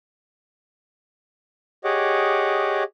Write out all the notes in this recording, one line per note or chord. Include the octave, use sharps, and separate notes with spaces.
G4 G#4 C#5 D#5 F#5 D6